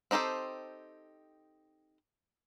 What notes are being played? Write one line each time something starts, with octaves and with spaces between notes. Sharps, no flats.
C4 D#4 G4 A4 C5